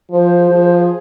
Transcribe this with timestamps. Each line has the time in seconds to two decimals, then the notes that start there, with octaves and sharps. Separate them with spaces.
0.11 F3 C5
0.37 G#4
0.50 F3
0.63 G#4